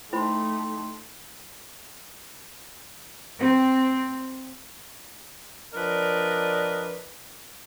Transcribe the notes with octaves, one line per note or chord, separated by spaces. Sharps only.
A3 D#4 E4 C5 G5 B5 C6
C4
F3 D4 A#4 B4 D5 D#5